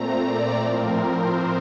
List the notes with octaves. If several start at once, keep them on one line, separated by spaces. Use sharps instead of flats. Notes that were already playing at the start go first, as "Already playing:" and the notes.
Already playing: A#2 A3 C4 A#5
D5
A2 F3 C4 A#4
C5